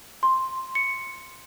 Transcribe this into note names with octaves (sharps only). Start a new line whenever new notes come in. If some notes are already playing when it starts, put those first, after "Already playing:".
C6
C#7